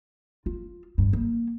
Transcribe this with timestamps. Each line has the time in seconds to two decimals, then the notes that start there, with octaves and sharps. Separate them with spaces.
0.46 F4
0.98 G2
1.13 A#3